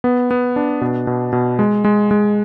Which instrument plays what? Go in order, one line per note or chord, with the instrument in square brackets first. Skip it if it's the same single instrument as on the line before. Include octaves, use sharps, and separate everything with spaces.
[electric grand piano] B3
B3
D4
B2
B2
B2
G#3
G#3
G#3